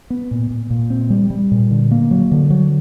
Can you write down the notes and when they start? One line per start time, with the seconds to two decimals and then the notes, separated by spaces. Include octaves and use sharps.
0.10 B3
0.31 A#2
0.51 A#2
0.70 A#2
0.90 C4
1.10 G3
1.30 G3
1.51 A#2
1.71 D3
1.91 A#3
2.11 F#3
2.31 D3
2.50 F#3